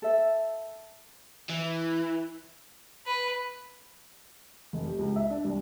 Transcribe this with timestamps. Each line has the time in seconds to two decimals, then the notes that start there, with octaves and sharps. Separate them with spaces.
0.02 A4 E5
1.50 E3
3.06 B4
4.73 F1
4.86 G4
4.99 C#2
5.16 E5
5.30 D4
5.45 C2